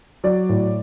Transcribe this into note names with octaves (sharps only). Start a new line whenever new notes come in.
F#3 D5
A2